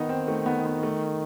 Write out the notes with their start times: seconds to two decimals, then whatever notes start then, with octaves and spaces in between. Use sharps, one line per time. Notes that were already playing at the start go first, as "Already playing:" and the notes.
Already playing: D#3 B3 D#4
0.09 C4
0.28 A3
0.46 B3
0.65 B3
0.83 A3